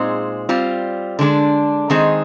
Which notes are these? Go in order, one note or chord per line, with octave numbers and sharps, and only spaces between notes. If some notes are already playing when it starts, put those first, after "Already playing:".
Already playing: A#2 G#3 C4 D#4 G#4
G3 C4 F4
D3 G#3 D4
D#3 G#3 C4 D#4 G#4